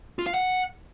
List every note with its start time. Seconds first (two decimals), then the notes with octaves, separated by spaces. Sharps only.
0.19 F4
0.26 F5
0.34 F#5